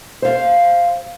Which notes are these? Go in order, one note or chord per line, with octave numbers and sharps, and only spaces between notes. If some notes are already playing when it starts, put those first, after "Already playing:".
C5 F5